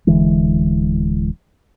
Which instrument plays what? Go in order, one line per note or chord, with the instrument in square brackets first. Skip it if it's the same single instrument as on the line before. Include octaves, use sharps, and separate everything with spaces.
[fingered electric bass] D1 D3 E3 G#3